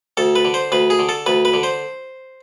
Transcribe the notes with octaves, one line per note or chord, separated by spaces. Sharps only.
D2 A4
B4
D3
C5
D2 B4
G#4
D3
A4
D2 B4
B4
D3
C5